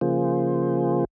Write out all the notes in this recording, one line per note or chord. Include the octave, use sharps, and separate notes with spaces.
C#3 F3 A#3 F4 G#4 C5